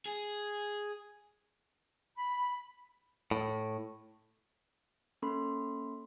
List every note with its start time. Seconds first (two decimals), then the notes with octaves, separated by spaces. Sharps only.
0.06 G#4
2.16 B5
3.31 A2
5.22 A#3 C#4 A4 B5 C6